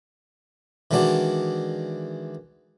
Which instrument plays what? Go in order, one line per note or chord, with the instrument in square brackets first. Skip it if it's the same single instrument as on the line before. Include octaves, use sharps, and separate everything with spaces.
[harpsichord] D#3 E3 G#3 D4 F#4 D5